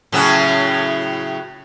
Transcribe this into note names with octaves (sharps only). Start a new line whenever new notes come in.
A2 C#3 F#3